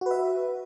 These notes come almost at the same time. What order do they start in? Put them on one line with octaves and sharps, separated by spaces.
F#4 B4 E5